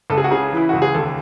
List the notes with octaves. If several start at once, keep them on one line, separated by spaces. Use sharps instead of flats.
C#2 A4
G#4
F#4
C#3 G#4
E3 E4
C#2 F#4
G#4
D#2 A4